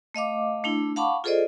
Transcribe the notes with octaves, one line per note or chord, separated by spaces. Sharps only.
A3 D#5 F5 D6
A3 D4 E4
F5 F#5 A5 B5 C#6 D6
F4 G#4 A4 C5 D5 D#5